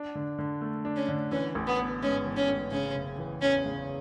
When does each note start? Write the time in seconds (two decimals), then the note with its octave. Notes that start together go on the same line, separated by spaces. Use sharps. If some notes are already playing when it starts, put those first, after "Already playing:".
Already playing: D4
0.15 D3
0.39 D3
0.61 A3
0.85 D4
0.96 C#4
1.09 D3
1.31 E3 C#4
1.55 A1
1.67 B3
1.79 B3
2.02 G#2 C#4
2.26 E3
2.36 C#4
2.49 A1
2.71 C#3 C#4
2.95 F#1
3.18 E3
3.42 E2 C#4
3.66 C#3